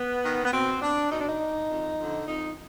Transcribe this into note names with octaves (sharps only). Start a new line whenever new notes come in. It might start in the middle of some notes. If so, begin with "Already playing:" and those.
Already playing: B3
D#3
B3
B2 C4
D4
B2 D#4
D4
D#4
F2
D3 F3
F2 D#4